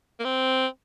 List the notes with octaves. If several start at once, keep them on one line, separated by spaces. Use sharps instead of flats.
A#3
C4